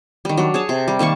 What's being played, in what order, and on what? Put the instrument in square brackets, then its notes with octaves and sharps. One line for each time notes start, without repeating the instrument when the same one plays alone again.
[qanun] D#3 G3
F#3 D4
G#4 C#5 A5
C3
G3
D#3 A#3 A5 C#6